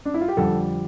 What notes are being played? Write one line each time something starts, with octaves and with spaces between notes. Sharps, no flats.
D4
E4
F4
G4
F2 D3 G3 A4